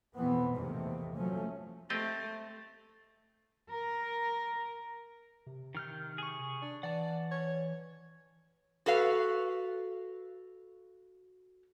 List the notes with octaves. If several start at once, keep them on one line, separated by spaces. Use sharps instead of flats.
F2 B2 E3 B3 C4
A#1 E2 C3 D#3 A3 A#3
F3 F#3 A3 C#4
A3 C4 G4 D#5
A#4
C3
D#3 F6 G6
G#4 C#6
D4
E3 D5 F#5 A5
C#5
F#4 A4 B4 F5